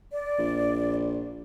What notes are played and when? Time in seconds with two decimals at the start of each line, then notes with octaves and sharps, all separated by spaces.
0.11 D5
0.38 A#1